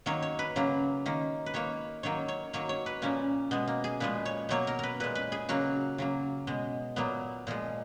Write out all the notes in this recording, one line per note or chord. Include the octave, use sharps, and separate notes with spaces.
D#3 F#3 A#3 C#5
C#5
B4
C#3 F#3 A#3
D#3 A#3
B4
D#3 A#3 C#5
D#3 F#3 A#3 C#5
C#5
D#3 F#3 A#3 C#5
C#5
B4
A#2 F3 A#3 C#4
B2 G#3 B3
A#3
G#4
A#2 F3 G#3 B4
C#5
B2 F#3 A#3 C#5
A#4
A#4 B4
A#2 G#3 B4
B4
G#4
C#3 F#3 A#3 F#4
C#3 F#3 A#3
B2 G#3
A#2 F#3 A#3 B3
A#2 F3 G#3